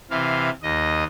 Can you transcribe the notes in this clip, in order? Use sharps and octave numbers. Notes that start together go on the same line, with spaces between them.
C3 E3 F5
D#2 D#5